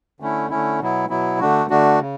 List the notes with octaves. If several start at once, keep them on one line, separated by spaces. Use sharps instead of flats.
D3 A3 C#4 E4
D3 A3 C#4 E4
B2 F#3 B3 E4
B2 F#3 B3 E4
D3 A3 D4 F#4
D3 A3 D4 F#4
C#3